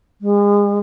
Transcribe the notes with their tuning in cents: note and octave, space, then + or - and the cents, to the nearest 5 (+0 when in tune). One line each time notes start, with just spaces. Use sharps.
G#3 -35